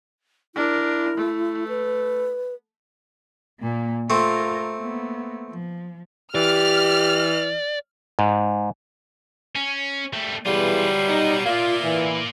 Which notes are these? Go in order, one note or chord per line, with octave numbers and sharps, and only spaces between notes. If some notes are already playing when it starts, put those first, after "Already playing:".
D4 E4 A#4
A3
B4
A#2 A#3
A3 C4 F4 A#4
A#3 B3
F3
E3 G4 D5 F6
G#2
C#4
G3 A3
B2 E3 F#3 G3 F4 G#4 B4
B3 D#4 F#4
A#2 A#3 F4 D5 E5 F5
E3